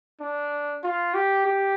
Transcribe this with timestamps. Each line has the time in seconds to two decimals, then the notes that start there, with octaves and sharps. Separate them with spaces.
0.21 D4
0.84 F4
1.15 G4
1.46 G4